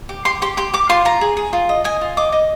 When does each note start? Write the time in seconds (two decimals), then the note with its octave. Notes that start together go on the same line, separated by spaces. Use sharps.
0.09 G4
0.25 G4 C6
0.42 G4 C6
0.57 G4 C6
0.73 G4 D6
0.89 F4 C6
1.05 F4 A#5
1.21 G#4
1.37 G#4
1.53 F4
1.69 D#5
1.84 D#5 G#5
2.01 F4
2.17 D#5 D6
2.32 D#5